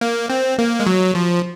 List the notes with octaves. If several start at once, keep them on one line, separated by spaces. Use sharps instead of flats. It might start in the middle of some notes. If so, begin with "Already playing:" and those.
A#3
C4
A#3
G#3
F#3
F3